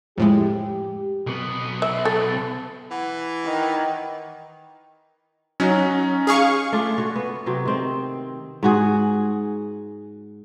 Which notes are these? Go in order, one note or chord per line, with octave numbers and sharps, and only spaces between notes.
F2 A2 G#3 G4
B1 B3
E5
A4
E3 F#5
D#3
F#3 C#4 D#4
G#4 F5 C#6
A3 C#4 D4 F4
F#4 A4 C#5
B3
C3 F#3 C4 B4
D#3 C4 D#5
G#2 F#4 G#4